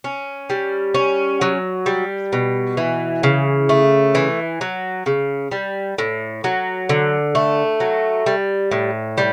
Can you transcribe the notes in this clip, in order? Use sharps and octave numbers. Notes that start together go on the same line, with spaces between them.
C#4
G3
C#4
F#3
G3
B2
E3
C#3
A3
E3
F#3
C#3
G3
A2
F#3
D3
A3
F#3
G3
A2
G3